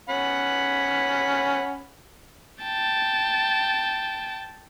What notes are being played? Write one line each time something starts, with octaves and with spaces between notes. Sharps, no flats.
C#4 F#5 B5
G5 A5